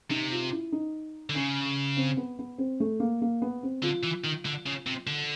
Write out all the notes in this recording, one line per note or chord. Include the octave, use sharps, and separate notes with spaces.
C3 D#4
F4
E4
D#4
D3
C#3 C#4
C4
B3
B3
C4
A3
A#3
A#3
B3
C4
D3 F4
E3
D#3
D3
C#3
C3
D3